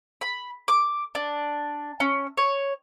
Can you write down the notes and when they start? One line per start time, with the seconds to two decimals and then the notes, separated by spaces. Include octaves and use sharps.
0.21 B5
0.68 D6
1.15 D4
2.00 C#4
2.37 C#5